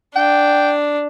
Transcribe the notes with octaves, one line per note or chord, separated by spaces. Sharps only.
D4 G5